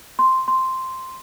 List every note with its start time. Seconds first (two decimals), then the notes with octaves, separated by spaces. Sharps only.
0.19 C6
0.48 C6